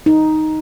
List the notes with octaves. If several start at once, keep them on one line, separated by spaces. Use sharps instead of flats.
D#4